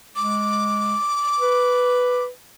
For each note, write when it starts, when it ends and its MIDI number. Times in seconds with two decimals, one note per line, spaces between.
0.16 0.95 56
0.16 2.24 86
1.40 2.29 71